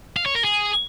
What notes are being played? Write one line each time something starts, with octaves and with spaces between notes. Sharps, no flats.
F5
C#5
A#4
G#4